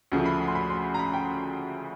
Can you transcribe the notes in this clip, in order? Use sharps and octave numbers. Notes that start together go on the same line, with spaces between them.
D2 C#3 F3 A3
B5
C6
B5
C6
A#5
B5
G5